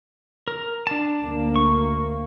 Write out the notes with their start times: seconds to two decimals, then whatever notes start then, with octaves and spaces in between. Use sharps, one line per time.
0.48 A#4
0.87 D4 A5
1.22 D2 A#3
1.56 C#6